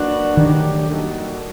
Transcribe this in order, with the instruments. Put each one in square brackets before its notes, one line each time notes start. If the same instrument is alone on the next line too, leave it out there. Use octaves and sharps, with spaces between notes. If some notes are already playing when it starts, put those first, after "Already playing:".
Already playing: [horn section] F#3 A#3 D4 F#4 B4
[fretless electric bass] D#3 [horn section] F#3 A3 D4 G4
[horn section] G3 A#3 D#4 F#4 A4